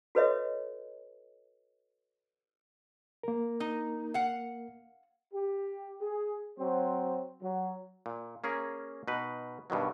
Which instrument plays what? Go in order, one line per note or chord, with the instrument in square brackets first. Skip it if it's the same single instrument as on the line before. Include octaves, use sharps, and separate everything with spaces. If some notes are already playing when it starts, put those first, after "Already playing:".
[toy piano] F#4 A4 B4 C#5 D#5 E5
[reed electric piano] A#3 A#4
[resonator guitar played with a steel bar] D#4
F5 F#5
[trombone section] G4
G#4
F#3 C4 C5
F#3
[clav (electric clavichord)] A#2
A#3 C#4 G#4 A#4
B2 D#4 B4
G2 B2 D#3 F#3